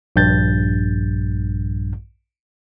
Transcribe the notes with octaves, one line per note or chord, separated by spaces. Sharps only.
A#1 G2 G6 A6